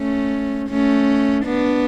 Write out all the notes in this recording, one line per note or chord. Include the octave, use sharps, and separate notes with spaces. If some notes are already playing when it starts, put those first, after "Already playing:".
Already playing: A3 C#4
A3 C#4
B3 D4